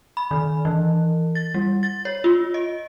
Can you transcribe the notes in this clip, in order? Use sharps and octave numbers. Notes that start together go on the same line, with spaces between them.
B5
D#3
E3
A6
G3
A6
C#5
F4
D#5